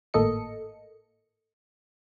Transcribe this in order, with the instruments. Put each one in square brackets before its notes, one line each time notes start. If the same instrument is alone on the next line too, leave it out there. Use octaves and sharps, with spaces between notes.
[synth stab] G#1 A2 A#3 A4 D#5 C#7